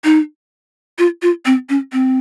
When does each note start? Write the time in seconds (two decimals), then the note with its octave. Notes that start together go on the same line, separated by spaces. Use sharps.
0.04 D#4
0.98 F4
1.22 F4
1.45 C4
1.69 C#4
1.93 C4